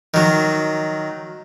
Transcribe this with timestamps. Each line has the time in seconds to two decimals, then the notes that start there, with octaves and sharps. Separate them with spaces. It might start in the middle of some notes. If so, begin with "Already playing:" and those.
0.14 D#3 F#3